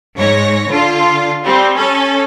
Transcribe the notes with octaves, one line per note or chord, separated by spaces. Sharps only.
G#2 C#5 A#6
D3 F4
G3 C4
C#4 A4